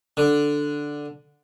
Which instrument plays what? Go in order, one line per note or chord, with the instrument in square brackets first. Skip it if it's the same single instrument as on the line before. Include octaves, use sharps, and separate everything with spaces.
[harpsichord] D3